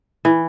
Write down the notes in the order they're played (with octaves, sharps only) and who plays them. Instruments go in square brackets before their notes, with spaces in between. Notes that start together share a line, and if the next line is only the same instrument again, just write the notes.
[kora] E3